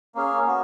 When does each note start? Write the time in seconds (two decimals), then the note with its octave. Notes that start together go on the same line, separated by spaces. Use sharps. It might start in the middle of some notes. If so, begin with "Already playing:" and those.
0.15 A#3 C#4 G#4
0.46 B3 F#4